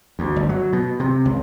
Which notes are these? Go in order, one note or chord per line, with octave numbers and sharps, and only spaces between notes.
D2
G1
F#3
B2
C3
C#2